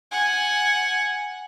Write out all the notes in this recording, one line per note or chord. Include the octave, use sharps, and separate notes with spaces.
F#5 G#5